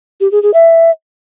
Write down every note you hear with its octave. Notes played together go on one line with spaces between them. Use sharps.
G4
G#4
G#4
E5